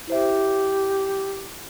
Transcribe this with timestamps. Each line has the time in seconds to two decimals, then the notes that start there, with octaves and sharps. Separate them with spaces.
0.08 E4 G4 C5 E5